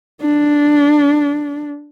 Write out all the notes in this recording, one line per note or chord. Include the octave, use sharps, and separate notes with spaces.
D4